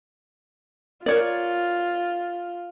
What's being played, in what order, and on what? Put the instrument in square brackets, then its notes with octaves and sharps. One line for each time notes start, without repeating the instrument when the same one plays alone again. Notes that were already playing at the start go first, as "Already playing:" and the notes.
[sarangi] F4 [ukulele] A#4 C#5 D5